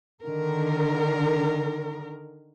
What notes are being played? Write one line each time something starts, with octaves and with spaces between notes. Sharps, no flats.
D3 D#3 A#4